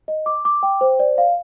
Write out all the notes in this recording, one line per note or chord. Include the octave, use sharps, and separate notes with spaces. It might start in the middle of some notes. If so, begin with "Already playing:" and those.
D#5
D6
D6
G5
C5
D5
F5